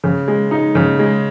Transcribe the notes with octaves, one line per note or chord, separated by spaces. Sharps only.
C#3
G#3
D#4
C#3
G#3